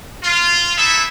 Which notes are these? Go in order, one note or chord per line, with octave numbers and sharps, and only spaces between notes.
F4
A3 D#4 E4 G#4 A4 E5